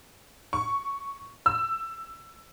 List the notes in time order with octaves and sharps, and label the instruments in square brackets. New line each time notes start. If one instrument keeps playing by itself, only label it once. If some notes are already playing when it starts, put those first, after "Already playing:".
[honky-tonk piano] C#6
E6